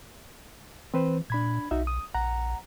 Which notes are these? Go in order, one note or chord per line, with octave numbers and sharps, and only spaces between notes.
E3 C4 B4 C5
A#2 D4 B5 G#6
B1 D#4 F#4 E5
D#6
A#1 F#5 A#5